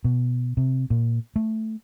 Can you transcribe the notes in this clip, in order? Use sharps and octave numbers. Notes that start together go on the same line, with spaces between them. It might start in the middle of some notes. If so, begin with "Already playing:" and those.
B2
C3
A#2
A3